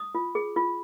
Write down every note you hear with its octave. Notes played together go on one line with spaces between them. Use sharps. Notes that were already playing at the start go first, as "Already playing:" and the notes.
Already playing: D#6
F4
G#4
F4